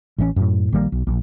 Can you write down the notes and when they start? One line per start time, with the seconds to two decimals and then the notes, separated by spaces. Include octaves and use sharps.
0.18 A1 E3 A3 C#4
0.36 F#2 A2
0.72 A#1 D#3 G3 A#3
0.92 B1
1.07 A#1